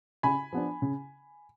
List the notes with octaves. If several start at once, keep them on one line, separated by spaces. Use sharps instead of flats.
C#3 G#5 B5
F3 B3 D4
C#3